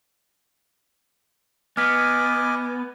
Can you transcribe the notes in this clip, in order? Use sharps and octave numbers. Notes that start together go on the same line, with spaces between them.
B3 D#5 G#5 D6 F6 B6